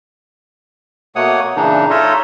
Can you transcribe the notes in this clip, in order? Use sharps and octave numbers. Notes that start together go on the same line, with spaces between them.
B2 A3 A#3 C#5 F#5 D#6
A#2 C#3 E3 D4 D#4
D#4 F4 A4 C#5 D#5 E5